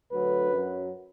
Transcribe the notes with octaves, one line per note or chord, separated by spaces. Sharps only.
D2 D3 F#3 B4
F#2 F#3